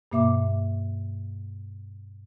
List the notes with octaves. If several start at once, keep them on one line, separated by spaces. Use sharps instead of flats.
G2 B2 A#3 E5 D6